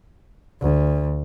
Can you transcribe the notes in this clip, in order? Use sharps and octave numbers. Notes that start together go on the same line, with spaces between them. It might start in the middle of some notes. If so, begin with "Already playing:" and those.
D2